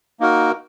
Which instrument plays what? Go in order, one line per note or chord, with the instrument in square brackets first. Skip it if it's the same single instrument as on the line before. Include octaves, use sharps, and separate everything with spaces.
[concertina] A#3 D#4 F#4 A#4